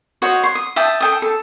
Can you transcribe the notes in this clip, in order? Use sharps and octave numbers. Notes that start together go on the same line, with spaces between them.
F#4 C5 C#5 D#5
C6
D#6
E5 G5 A5 D#6
A4 G5 D#6
A4